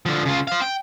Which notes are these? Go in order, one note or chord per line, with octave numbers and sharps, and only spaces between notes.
D3 F3
C#3 F4
C5 F5
G5